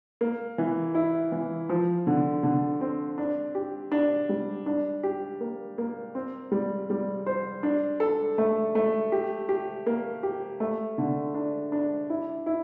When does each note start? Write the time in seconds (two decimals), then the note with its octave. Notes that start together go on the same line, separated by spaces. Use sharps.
0.21 A#3
0.58 E3
0.94 E4
1.32 E3
1.69 F3
2.07 D3
2.43 D3
2.81 C4
3.18 D4
3.55 G4
3.92 D4
4.29 G3
4.66 D4
5.03 G4
5.41 A#3
5.78 A#3
6.15 C4
6.52 G3
6.90 G3
7.26 C5
7.63 D4
8.00 A4
8.38 A3
8.75 A3
9.12 G4
9.49 G4
9.86 A#3
10.23 G4
10.60 A3
10.98 D3
11.34 D4
11.72 D4
12.10 E4
12.46 E4